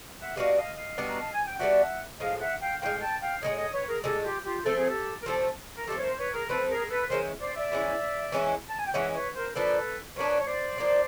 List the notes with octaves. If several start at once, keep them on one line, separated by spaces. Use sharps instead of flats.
E5 F#5
G3 B3 D4 F#4 D#5 F5
D#5 F5
D#5 F5
G3 B3 D4 F#4
A#5
A5
G#5
G5
G3 B3 D4 F#4 E5 F#5
A2 F3 G#3 D#5 F5
E5 F#5
F5 G5
A2 F3 G#3 F5 G5
G5 A5
F5 G5
A2 F3 G#3 C#5 D#5
C#5 D#5
B4 C#5
G#4 A#4
A2 F3 G#3 G4 A4
F4 G4
F4 G4
F3 A3 C4 A4
G#4
G4 A4
A#4
F3 A3 C4 G4 A4
A#4
F3 A3 C4 G4 A4
C#5
A#4 C5
B4 C#5
G#4 A#4
F3 A3 C4 A4 B4
G#4 A#4
A4 B4
E3 G#3 C#4 E4 A#4 C5
C5 D5
D5 E5
E3 G#3 C#4 E4
E3 G#3 C#4 E4
A5
G#5
G5
E3 G#3 C#4 E4 E5 F#5
B4 C#5
A#4 C5
F3 A#3 D4 A4 B4
F3 A#3 D4 B4 C#5
C#5
C5 D5
F3 A#3 D4